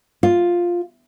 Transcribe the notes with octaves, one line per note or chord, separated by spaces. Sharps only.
F4